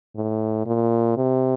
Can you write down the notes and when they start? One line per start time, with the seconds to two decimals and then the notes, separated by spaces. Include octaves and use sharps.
0.16 A2
0.66 A#2
1.17 C3